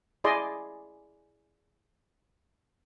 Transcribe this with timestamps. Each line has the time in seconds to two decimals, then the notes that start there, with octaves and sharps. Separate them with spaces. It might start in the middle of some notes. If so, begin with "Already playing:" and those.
0.24 E4 G#4 D5 D#5 C6